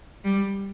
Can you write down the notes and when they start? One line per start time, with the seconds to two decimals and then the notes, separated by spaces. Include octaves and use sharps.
0.24 G3